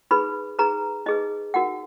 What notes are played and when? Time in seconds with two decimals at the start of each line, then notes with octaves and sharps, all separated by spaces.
0.11 D#4 G#4 B4 B5
0.59 D#4 G#4 B4 A#5
1.06 D#4 G#4 B4 D#5
1.54 D#4 F#4 A#4 F#5